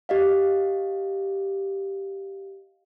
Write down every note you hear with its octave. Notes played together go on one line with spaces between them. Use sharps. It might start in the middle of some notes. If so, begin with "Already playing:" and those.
G4 D#5 F5